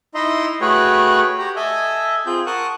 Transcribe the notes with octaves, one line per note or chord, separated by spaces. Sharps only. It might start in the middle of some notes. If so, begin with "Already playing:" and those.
D#4 E4 D#5 E5 A#5 C6
A3 F#4 G#4 B4 C#5 G5
G4 A#5
A4 D#5 E5 G#5
C4 F4 G#4 G6
A#4 F#5 A5 C#6 D#6 F#6